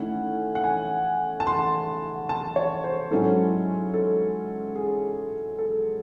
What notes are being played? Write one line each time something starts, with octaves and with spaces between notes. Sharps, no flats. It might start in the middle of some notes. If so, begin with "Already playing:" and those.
Already playing: D#3 A3 C#4 E4 F#5
F#5
G#5
A5
C6
A5
C#5
C5
G#2 F#3 C#4 E4 A4
A4
G#4
A4